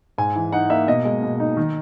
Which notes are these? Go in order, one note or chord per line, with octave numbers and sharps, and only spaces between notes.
G#2 G#5
E3
D#4 F#5
A#3 E5
B2 D#5
G#3
B2
D#4
D#3